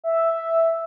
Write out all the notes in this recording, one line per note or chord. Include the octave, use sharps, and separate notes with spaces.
E5